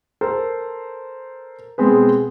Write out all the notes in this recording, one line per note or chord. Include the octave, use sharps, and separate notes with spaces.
A4 A#4 C5
B2 G#3 B3 C4 G#4 B4